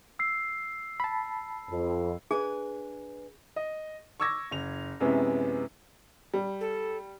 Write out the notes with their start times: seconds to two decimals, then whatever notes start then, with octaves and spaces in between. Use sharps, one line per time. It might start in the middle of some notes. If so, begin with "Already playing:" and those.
0.19 E6 C7
1.00 A5 B5
1.70 F2
2.31 D4 G#4 B4 G#5
3.56 D#5
4.20 C#6 D6 E6 G#6 A#6
4.51 F#1 F7
5.00 F#2 C3 G#3 B3 C#4 E4
6.34 G3
6.61 A4